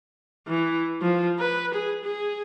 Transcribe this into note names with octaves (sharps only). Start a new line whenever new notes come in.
E3
F3
B4
G#4
G#4